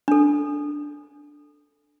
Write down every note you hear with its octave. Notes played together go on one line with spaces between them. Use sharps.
D4 A4